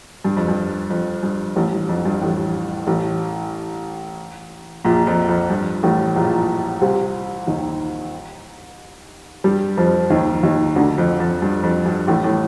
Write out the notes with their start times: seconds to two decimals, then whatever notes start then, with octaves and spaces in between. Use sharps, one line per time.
0.25 G2
0.37 F2
0.48 G2
0.90 F2
1.23 G2
1.56 A1 A2
1.73 G2
1.89 F2
2.05 G2
2.21 A1 A2
2.87 A1 A2
4.85 A#1 A#2
5.07 F2
5.29 F2
5.50 G2
5.83 A1 A2
6.16 A#1 A#2
6.81 C2 C3
7.47 D#2 D#3
9.44 G2 G3
9.77 F2 F3
10.10 D#2 D#3
10.43 D#2 D#3
10.76 D2 D3
10.98 F2
11.20 F2
11.42 G2
11.63 F2
11.86 G2
12.07 A1 A2
12.24 A2